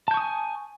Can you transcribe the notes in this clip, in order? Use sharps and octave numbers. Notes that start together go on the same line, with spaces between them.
G#5 A5 C#6 D#6 G6